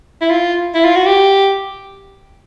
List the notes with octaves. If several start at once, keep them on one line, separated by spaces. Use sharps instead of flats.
E4
F4
E4
F4
F#4
G4